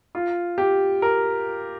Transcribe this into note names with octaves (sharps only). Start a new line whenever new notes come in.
F4
G4
A#4